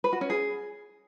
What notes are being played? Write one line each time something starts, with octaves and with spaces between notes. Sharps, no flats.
B4
F#4
C#4
G#4